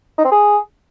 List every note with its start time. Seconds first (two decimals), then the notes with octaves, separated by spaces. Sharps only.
0.18 D#4
0.25 C4
0.32 G#4